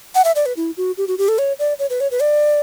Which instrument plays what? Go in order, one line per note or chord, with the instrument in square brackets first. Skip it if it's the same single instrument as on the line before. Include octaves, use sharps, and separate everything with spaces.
[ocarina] F#5
E5
D5
B4
E4
F#4
G4
F#4
G4
A4
C#5
D5
C#5
B4
C#5
B4
D5